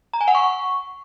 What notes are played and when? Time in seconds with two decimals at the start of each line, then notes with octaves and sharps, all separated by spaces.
0.13 A#5
0.21 G#5
0.28 F#5
0.35 C#6